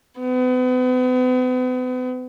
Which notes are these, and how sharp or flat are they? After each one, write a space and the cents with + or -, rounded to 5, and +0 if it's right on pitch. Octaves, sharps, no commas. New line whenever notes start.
B3 +40